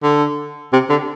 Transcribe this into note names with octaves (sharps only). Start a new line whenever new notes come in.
D3
C3
D3